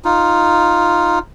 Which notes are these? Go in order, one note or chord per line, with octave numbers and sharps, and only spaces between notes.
D#4 F4